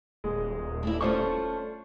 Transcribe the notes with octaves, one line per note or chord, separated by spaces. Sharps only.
D#1 G#3
A3 D4 E4
A3 C#4 D4 F4 C5 C#6